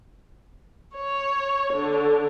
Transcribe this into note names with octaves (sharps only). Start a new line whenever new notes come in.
C#5
D3